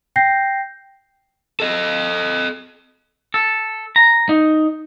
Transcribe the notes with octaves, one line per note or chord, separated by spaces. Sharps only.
G5 G6 A#6 C7
A4 D#5
A4
A#5
D#4